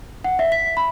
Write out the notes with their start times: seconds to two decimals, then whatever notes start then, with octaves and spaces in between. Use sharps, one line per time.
0.24 F#5
0.39 E5
0.52 B6
0.77 B5